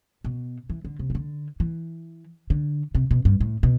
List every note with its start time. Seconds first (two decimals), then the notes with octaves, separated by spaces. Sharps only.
0.24 B2
0.70 E3
0.85 D3
0.99 C3
1.10 E3
1.15 D3
1.60 E3
2.50 D3
2.95 C3
3.11 B2
3.25 G2
3.40 A2
3.63 B2